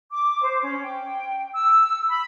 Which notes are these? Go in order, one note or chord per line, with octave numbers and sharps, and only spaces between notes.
D6
C5
C#4
G5
E6
B5